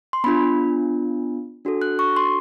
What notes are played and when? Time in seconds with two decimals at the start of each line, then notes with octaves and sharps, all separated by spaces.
0.13 C6
0.24 B3 D4 F4 B5
1.65 D4 F#4 A4
1.82 F#6
1.99 C#6
2.16 C6